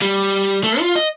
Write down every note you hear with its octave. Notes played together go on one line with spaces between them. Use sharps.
G3
A3
F4
D#5